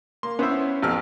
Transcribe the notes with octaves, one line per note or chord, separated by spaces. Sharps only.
A#3 C6
B3 C#4 E4 C5 E5
A1 F2 B3 G4 E6 F6